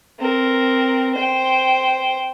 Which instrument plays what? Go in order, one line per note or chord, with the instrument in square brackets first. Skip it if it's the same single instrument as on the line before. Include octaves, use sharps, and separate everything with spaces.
[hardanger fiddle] C4 A#4
C5 G5